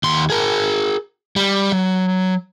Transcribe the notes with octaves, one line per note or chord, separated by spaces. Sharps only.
D#2 C6
G#4 A#4
G3
F#3